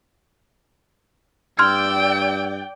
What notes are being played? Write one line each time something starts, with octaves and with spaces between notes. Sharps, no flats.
G2 D5 G5 C6 E6 F6 G#6 D7